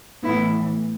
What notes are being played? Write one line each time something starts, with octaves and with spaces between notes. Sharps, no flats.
A2 E3 B3 E4